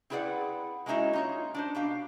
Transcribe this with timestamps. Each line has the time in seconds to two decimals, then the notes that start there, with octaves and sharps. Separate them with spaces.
0.10 C4 E4 G#4 B4 D5 F#5
0.86 G#3 A#3 C#4 D#4 E4 F#4
1.13 D#4 F4 C#5
1.54 D4 D#4 C5
1.75 B2 G4 F5